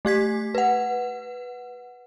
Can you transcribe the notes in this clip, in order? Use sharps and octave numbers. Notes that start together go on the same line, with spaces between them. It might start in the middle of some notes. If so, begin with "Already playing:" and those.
A3 G4 G#6 B6
B4 F#5